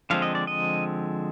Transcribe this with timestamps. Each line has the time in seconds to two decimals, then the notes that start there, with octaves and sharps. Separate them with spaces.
0.10 D3 F3 G#3 C4 F5
0.22 D#5
0.35 D5
0.47 D#5